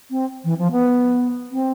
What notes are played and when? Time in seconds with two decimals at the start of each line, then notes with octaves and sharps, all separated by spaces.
0.11 C4
0.44 E3
0.58 F3
0.71 B3
1.51 C4